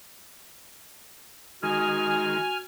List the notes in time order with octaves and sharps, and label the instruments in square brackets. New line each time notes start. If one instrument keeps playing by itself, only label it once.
[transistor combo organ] D#3 G#3 [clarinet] F#4 [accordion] G#5 F6